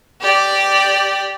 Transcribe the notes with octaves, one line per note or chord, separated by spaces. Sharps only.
G4 D5